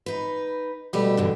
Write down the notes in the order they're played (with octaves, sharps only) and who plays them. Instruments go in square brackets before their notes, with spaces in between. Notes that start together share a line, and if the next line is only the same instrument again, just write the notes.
[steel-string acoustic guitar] D#4 B4
[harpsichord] B2 G3 [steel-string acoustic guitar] A3 G4
[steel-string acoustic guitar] E2 G2 D3